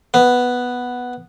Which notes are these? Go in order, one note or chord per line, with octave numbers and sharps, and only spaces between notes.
B3